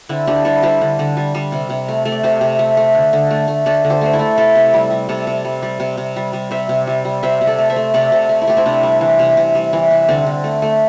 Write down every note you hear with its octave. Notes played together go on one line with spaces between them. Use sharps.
D3 C4 E4
D3 D4 G4
G3 E4 A4
G3 G4 C5
D3
D3
G3
G3
C3
C3
A3
A3
D5
C3 G4 C5
C3
A3
A3
D3
D3
A3
A3
D3 A4 D5
D3
G4 C5
A3 C5
E4 A4
A3
C3 E4 A4
C3
G3
G3
C3 A4 D5
C3
G3
G3
C3
C3
G3
G3
C3 C5 E5
C3
G3
G3
C3 C5 E5
C3
A4 D5
A3
C5 E5
A3
C3 A4 D5
C3
A3
E4
A3 G4
C4 E4
C3 D4
G3
E3
C3
C3
G3
E3
C3
D3 C4
D3
A3
A3